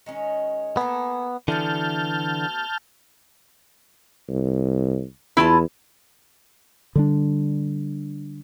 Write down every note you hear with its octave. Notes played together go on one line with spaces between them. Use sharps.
D#3 G#3 C#4
A#3 B3 A4 G#5
D3 E3 A3 B3 F#4 A5 F6 G6
C2
E2 E4 F4 A5
D3 G3 D4